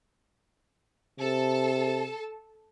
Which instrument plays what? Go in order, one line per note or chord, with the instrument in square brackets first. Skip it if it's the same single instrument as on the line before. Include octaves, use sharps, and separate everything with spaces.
[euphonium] C3 [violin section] A4 A5